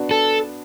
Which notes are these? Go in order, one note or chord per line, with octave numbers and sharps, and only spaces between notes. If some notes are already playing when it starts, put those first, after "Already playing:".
Already playing: B3 D4 F#4
A4